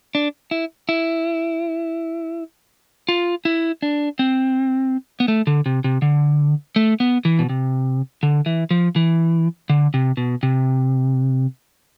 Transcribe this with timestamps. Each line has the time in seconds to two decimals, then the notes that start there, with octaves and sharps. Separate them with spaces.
0.15 D4
0.51 E4
0.89 E4
3.09 F4
3.45 E4
3.82 D4
4.19 C4
5.20 B3
5.28 A3
5.47 D3
5.66 C3
5.84 C3
6.02 D3
6.76 A3
7.00 B3
7.25 E3
7.39 B2
7.49 C3
8.23 D3
8.46 E3
8.71 F3
8.96 E3
9.70 D3
9.94 C3
10.17 B2
10.43 C3